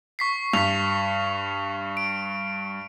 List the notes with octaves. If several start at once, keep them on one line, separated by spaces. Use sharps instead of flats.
C#6 B6 C7
G2 B6 F7
D7